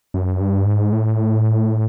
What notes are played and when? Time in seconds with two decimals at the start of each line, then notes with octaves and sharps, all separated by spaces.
0.14 F#2
0.41 G2
0.66 G#2
0.92 A2